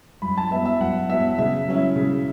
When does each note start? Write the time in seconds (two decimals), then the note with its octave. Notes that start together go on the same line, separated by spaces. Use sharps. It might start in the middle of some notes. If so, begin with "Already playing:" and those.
0.22 F#2 B5
0.37 A5
0.51 F#3 B3 E5
0.65 E5
0.80 F#2 F#5
1.09 F#3 B3 E5
1.38 C#3 E5
1.68 F#3 C#4 E4
1.96 C#3